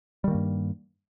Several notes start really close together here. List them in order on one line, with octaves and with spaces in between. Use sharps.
G3 D#3 A#3 G2